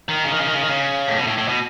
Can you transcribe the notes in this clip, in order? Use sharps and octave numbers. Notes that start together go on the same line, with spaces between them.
D#3
C#3
D#3
C#3
D#3
C#3
D#3
C#3
A2
B2
A2
A2
B2